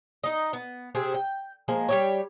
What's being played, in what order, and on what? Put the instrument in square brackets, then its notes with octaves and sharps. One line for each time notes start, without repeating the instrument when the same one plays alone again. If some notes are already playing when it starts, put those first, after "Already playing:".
[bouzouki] D#4 D#5
B3
C3 C4 G4 G#4
G5
F3 G#3 A#3
G3 G4 C#5